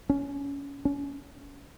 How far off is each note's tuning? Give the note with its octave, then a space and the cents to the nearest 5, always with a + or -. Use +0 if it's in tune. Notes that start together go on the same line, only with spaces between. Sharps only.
C#4 +20
C#4 +30